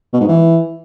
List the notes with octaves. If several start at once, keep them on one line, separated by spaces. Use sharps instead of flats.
B2
G#2
E3